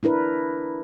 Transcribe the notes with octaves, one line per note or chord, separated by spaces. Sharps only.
D4 E4 A#4 B4